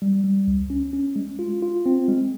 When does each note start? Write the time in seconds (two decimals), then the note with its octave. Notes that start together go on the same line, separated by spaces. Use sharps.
0.02 G3
0.24 G3
0.48 C#2
0.70 C#4
0.93 C#4
1.16 G#3
1.39 F4
1.62 F4
1.86 C4
2.08 G#3